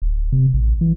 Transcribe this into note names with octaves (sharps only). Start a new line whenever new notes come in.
D1
C3
A1
E3